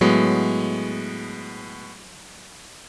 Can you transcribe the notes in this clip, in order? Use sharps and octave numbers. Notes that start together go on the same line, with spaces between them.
A2 F#3 G#3 B3